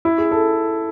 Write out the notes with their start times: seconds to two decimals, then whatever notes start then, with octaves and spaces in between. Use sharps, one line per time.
0.05 E4
0.18 G#4
0.32 A4